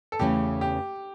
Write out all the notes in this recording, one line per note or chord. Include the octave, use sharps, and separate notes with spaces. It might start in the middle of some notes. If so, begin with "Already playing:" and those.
A4
E2 C#3 E3 A3 C#4 G4
G4